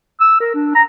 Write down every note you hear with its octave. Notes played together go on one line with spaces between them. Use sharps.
E6
A#4
D4
A#5